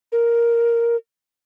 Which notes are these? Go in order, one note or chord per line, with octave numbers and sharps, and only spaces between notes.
A#4